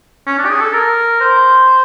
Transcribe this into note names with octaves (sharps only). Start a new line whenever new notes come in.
C#4
D4
G4
G#4
A4
A#4
C5